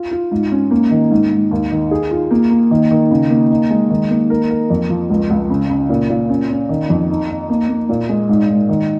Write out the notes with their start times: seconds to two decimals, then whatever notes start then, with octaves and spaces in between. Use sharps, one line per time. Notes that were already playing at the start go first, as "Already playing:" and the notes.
Already playing: F4
0.11 F4
0.32 G#2
0.51 C#4
0.71 A#3
0.91 D#3
1.11 G#2
1.31 G#2
1.51 D#2
1.71 D#3
1.91 G#4
2.11 F4
2.31 A#3
2.50 A#3
2.71 D#3
2.91 D#3
3.11 C#3
3.30 A#3
3.50 D#4
3.70 G#3
3.90 D#3
4.10 A#3
4.30 A#4
4.50 A#4
4.70 F2
4.90 F3
5.10 C#2
5.30 C#2
5.50 C#3
5.70 C#3
5.89 A#2
6.10 A#2
6.29 C#4
6.49 C#4
6.69 D#3
6.90 F2
7.09 D#4
7.29 D#4
7.49 A#3
7.69 A#3
7.89 A#2
8.09 G#3
8.29 G#2
8.49 G#2
8.69 D#3